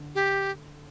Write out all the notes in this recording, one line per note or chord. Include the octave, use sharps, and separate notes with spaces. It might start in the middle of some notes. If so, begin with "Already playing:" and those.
Already playing: D3
G4